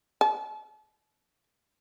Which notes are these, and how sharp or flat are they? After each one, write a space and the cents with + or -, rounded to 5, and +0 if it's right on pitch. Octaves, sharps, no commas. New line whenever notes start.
A5 -40